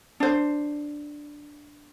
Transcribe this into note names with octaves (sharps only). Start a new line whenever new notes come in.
D4 C5